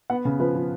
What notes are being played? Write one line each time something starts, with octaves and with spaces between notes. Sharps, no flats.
B3 F#5
C#3
F3 B4
F3